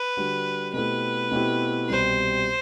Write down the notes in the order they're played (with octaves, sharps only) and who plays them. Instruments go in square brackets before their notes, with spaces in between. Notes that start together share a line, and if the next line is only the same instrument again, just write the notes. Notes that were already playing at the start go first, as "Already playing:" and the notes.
Already playing: [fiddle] B4
[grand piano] D3 G3 D4 F#4
[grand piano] B2 A3 C4 E4 G4 [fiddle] B4
[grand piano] B2 A3 C4 E4 G4
[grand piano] C2 B2 G3 [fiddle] C5